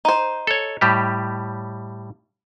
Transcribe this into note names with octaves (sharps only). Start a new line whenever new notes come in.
D#4 C5
A4 C#5
A2 G3 G4